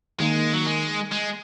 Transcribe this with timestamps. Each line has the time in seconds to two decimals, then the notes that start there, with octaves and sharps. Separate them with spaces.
0.20 D#3 G#3 A#3 D#4
0.54 F#3
0.66 G#3
1.12 G#3